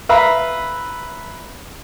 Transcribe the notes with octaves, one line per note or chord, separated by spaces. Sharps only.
B4 E5 F5 A#5 B5